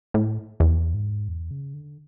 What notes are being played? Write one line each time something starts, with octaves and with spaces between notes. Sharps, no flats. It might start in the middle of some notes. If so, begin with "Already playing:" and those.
A2
E2
G#2
E2
C#3
D3